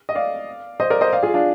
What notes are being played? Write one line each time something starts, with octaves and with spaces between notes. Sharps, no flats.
D#5
D5 F5
C5 D#5
A#4 D5
C5 D#5
D5 F5
F4 G#4
D4 F4